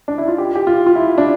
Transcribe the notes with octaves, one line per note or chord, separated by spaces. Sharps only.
D4
E4
F4
G4
G4
F4
F4
E4
D4